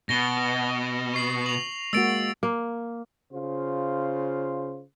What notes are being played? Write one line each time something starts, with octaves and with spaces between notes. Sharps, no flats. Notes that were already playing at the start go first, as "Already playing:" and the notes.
B2 A#6 G7
C#6 C7 F#7
F7 F#7
G#3 A#3 F#4 E6 A6 D7
A#3
C#3 F4 C5